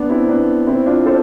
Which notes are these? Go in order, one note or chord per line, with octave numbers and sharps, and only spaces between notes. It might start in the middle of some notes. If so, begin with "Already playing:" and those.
Already playing: B3 D4
C4 E4
B3 D4
C4 E4
D4 F4
A4 C5